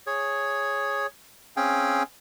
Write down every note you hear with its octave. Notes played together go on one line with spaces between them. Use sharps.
G#4 C#5
C4 C#4 G#4 F5 G5 G#5